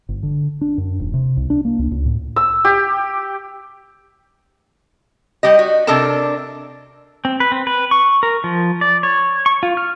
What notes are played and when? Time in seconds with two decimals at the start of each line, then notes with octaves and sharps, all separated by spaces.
0.09 G1
0.23 D3
0.61 D4
0.78 F#2
1.00 D#1
1.14 C3
1.37 C2
1.50 D4
1.65 A#3
1.79 C#2
1.91 C#2
2.05 A2
2.36 E6
2.65 G4
5.43 G3 G4 D#5
5.59 F#4
5.87 C3 D4 A4 A#4 A5
7.25 C4
7.40 B4
7.52 C4
7.67 B4
7.91 C#6
8.23 A#4
8.44 F3
8.81 D5
9.03 C#5
9.46 C#6
9.63 F4
9.77 F6